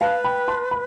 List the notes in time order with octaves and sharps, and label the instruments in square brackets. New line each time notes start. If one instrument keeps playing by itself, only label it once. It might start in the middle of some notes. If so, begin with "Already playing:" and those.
[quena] B4 [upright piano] F5 A5
[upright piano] G5 B5
A5 C6
B5